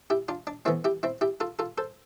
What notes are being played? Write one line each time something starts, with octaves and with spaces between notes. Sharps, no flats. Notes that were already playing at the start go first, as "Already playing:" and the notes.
E4 G4
D4 F4
D4
A2 E3 B3 C4 E4
E4 G4
C4 E4
E4 G4
F4 A4
F4 A4
A4 C5